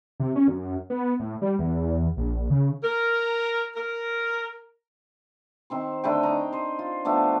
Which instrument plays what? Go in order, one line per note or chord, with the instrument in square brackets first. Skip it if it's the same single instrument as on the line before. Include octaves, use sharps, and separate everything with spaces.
[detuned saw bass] C3
C#4
F#2
B3
A2
G3
E2
A#1
C#3
[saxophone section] A#4
A#4
[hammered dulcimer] D#3 C4 C5
D3 A3 B4 G5
D#4 A#5
C5 D#5
F4
F3 A3 B3 D4